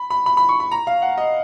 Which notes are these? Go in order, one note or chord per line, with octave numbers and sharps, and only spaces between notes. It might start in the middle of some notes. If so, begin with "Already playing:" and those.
Already playing: B5
B5
B5
B5
C#6
B5
A#5
F5
F#5
D#5